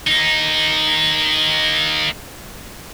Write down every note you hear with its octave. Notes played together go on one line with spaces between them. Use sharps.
A#3 D#4